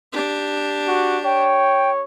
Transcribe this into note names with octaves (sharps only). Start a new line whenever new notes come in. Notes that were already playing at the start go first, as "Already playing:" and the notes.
D4 G4
F#4
C#5 G5